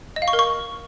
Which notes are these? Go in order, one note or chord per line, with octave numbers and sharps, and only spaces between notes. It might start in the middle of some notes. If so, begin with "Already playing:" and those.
D#5
F5
C#6
A#4
C#6